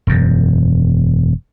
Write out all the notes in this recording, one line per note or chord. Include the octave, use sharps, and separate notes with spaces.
E1 F#2